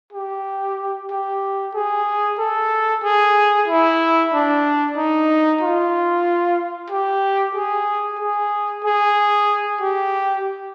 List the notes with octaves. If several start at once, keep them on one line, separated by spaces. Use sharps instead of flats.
G4
G4
G#4
A4
G#4
E4
D4
D#4
F4
G4
G#4
G#4
G#4
G4